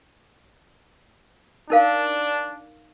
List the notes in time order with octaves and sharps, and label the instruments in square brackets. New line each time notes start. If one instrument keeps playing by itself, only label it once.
[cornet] D4 [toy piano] D#4 A#4 F5